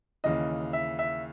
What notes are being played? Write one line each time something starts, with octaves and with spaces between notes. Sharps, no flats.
D#2 C#3 E3 D#5
E5
E5